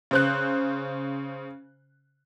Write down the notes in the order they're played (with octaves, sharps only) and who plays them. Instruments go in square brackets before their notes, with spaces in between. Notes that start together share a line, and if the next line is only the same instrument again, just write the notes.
[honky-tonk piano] C#3 C5 F#6